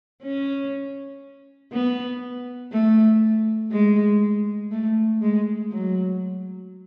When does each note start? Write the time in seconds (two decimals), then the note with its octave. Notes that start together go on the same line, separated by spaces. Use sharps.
0.23 C#4
1.73 B3
2.72 A3
3.72 G#3
4.71 A3
5.22 G#3
5.71 F#3